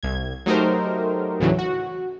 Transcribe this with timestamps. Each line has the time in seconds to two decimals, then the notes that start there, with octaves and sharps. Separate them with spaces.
0.03 C2 G#6
0.46 F#3 A3 D#4 G4 A#4 C5
1.40 D2 A2 C#3 E3 F#3
1.59 F#4